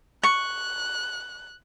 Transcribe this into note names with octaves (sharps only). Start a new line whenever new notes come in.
C#6 F#6